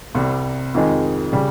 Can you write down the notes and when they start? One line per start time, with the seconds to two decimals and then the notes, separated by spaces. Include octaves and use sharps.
0.15 C2 C3 G3
0.74 F2 D#3 G#3
1.33 C#3 G3